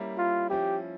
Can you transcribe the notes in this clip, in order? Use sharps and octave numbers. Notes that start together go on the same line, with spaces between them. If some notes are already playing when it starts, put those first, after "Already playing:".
Already playing: G3 A#3 C#4 E4
F4
F3 C#4 E4 G4